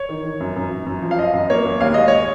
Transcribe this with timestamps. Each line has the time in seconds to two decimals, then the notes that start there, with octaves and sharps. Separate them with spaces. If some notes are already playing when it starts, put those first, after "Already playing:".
Already playing: C#5
0.09 D#3
0.24 D#3
0.40 F#2
0.56 F#2
0.71 F#2
0.86 F#2
1.02 F3
1.11 F5
1.18 F#2 D#5
1.33 F#2
1.50 A#3 C#5
1.64 F#2
1.81 D#2 F5
1.94 G#3 D#5
2.08 C#5